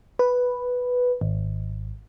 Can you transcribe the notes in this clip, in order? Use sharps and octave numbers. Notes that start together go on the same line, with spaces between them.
B4
G#1